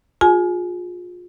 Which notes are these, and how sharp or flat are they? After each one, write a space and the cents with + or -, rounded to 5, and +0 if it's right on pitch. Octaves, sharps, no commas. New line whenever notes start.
F4 +30 G#4 -15 G#5 +25